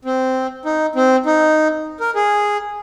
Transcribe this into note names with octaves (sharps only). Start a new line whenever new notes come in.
C4
D#4
C4
D#4
A#4
G#4